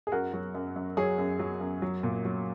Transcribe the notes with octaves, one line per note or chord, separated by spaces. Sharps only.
G#4
F#2 F#4 A#4
F#3
F#2
F#2
F#3 G#4 C#5
F#2
F#3
F#2
F#3
A#2
F#3